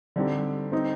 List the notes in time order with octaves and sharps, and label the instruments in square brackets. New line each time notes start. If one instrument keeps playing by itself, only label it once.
[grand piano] D3 G3 C4 D#4 G4
[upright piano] C4 D#4